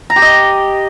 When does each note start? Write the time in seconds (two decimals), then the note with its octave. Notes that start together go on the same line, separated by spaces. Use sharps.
0.10 A#5
0.16 G4
0.22 D#5